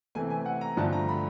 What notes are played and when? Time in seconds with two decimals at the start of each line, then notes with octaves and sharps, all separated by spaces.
0.15 C3 E3 A3 G#5
0.30 G#5
0.46 F#5
0.61 A#5
0.77 G2 D3 F3 A3 A5
0.92 A#5
1.08 B5